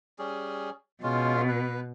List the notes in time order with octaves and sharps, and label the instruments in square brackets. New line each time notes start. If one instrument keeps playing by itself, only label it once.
[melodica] G3 C#4 G#4
[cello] B2 [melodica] G#3 C#4 F4
[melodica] B4